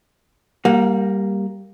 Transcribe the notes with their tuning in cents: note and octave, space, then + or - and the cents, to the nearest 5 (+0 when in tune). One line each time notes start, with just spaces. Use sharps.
G3 +0 A#3 +0 F#5 -40